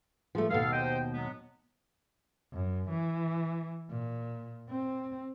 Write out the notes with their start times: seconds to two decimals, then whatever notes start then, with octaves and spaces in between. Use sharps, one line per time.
0.35 F3 G#3 A3
0.50 D#2 B2 A4 F5
0.72 C5 D#5 G5
1.13 F#3 G#3 B3
2.53 F#2
2.90 E3
3.90 A#2
4.69 C4